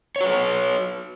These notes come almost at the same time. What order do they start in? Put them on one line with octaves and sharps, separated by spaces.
C#5 F#4 B4